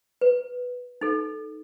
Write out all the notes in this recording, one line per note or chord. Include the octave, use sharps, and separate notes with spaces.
B4
D#4 A4